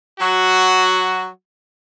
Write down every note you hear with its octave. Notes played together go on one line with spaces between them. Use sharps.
F#3 F#4